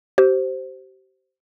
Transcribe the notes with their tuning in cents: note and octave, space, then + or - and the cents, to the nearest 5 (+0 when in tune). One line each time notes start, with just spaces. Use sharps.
G4 -35 C5 +0